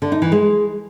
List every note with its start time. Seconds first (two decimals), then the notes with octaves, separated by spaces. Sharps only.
0.02 D3
0.12 D#4
0.22 E3
0.32 G#3